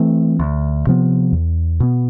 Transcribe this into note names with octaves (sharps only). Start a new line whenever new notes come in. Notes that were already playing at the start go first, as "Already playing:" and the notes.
Already playing: E3 A3 C4
D2
C3 F3 B3
E2
B2 B3